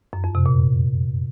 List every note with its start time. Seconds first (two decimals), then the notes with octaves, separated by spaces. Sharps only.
0.13 F#2
0.24 F2
0.35 C3
0.46 A#2